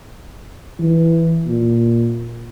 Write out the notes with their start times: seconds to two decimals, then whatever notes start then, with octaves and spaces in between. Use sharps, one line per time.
0.80 E3
1.47 A#2